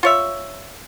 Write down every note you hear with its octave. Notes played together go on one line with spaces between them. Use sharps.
F4 C#5 E5